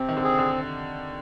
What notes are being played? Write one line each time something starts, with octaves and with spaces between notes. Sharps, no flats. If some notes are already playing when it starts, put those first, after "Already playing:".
Already playing: C3 C4
D#3
D3
G#4
D3